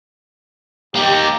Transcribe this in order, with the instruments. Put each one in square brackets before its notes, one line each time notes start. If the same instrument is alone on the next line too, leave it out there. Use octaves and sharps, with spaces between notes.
[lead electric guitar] A#3 D#4 [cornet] G4